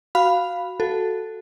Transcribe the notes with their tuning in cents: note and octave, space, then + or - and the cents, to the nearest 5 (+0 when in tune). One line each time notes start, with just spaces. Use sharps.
F#4 +0 F5 +0 B5 +0
F#4 +0 A4 +0